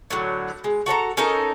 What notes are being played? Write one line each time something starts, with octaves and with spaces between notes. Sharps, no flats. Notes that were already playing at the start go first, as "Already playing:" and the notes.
A2 D3 F#3
G#3
F#4 A4 C#5 A#5
C#4 D#4 A4 A#4